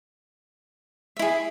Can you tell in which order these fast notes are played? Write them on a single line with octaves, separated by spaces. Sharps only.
E5 E4 G#4